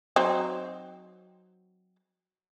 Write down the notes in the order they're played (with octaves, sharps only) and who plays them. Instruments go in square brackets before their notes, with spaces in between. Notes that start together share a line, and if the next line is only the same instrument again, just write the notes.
[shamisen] F#3 C4 D#4